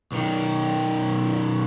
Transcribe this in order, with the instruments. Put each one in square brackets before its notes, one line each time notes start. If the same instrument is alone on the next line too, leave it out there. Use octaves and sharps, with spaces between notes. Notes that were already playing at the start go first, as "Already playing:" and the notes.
[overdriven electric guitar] B1 D#3